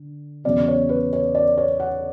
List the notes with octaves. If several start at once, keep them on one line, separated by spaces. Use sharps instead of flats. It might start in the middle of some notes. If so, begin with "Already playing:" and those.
Already playing: D3
E2 C#3 F#3 B3 D5
C#5
B4
C#5
D5
C#5
F#5